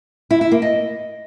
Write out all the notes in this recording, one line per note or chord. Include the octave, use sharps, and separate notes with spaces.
E4
E4
A#3
D#5